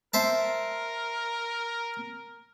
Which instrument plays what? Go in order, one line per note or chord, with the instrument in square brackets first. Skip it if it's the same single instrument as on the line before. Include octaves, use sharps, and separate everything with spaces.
[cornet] A#4 [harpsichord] C5 E5 A5